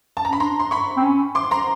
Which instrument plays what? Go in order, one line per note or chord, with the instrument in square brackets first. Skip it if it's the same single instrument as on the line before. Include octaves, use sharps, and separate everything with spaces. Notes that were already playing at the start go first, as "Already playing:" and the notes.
[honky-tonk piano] A5
A#5
[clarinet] C#4 [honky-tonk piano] B5
[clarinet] D4 [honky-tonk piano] A#5 C6
[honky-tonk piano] C6
B5 C#6
[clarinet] C4
C#4
[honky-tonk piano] C6 D6
A#5 C6